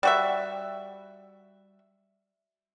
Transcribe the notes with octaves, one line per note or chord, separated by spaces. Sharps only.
G3 F#4 E5